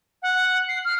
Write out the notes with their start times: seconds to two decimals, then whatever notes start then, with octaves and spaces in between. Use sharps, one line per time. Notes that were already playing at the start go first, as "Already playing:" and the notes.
0.22 F#5
0.68 C7
0.85 F6